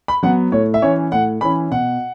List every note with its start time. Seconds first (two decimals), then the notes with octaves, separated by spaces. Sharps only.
0.08 B5
0.23 F#3 B3 F#5
0.52 A2 C#5
0.74 E5
0.82 E3 C#4 C#5
1.12 A2 F#5
1.41 E3 C#4 B5
1.71 B2 F#5